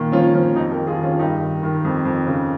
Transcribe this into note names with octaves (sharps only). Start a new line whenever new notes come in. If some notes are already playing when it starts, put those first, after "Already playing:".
Already playing: A#2 D#3
F3 C#4 F4
F3 C#4 F4
F2 D#4 G4
G4 A#4
D#3
F4 G#4
D#3 C#4 F4
G2 D#4 G4
D#3
D#3
F2
F2
C#3